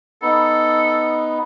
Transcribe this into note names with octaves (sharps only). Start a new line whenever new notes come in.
B3 D#4 A4